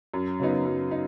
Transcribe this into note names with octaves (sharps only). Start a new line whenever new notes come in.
F#2
C#3 F#3 B3 D#4
F#2
D#4